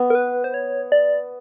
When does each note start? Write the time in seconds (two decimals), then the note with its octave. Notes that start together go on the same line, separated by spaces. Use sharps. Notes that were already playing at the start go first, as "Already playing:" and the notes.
Already playing: B3
0.10 A#4
0.15 B4
0.44 C5
0.54 C#5
0.92 D5